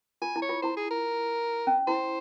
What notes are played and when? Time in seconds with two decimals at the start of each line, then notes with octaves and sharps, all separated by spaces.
0.22 F4 G#5
0.36 E4
0.42 C#5
0.49 F4
0.62 E4 C5
0.77 G#4
0.90 A#4
1.67 C#4
1.87 E4 C5